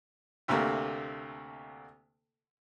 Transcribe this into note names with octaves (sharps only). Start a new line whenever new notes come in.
D2 C3 A3 A#3